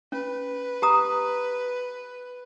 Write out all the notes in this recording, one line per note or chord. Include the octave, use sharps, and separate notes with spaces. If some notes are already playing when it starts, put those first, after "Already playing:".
C#4 B4
G4 A#5 D#6